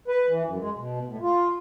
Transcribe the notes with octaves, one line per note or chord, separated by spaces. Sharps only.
B4
E3
F#2
G#3
B2
A2
F4